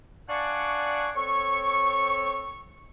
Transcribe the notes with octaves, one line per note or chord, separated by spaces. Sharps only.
D4 D5 F5 F#5 G#5 C#6
C4 A4 C#5 C#6